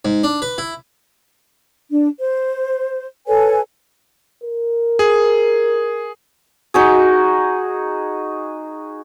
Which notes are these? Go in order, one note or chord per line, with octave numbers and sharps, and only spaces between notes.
G#2
D4
B4
E4
D4
C5
A4 B4 C#5 G#5
A#4
G#4
D#4 F#4 G#4